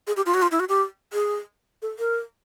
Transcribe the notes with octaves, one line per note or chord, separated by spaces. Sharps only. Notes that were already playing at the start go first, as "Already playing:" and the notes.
G#4
G4
F4
F#4
F4
E4
F#4
G4
G#4
A4
A#4